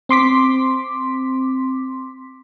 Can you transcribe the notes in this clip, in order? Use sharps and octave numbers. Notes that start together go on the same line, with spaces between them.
C4 C6 D6 B6